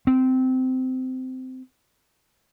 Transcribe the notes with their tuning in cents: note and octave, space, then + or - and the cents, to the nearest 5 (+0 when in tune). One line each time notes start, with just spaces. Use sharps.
C4 -20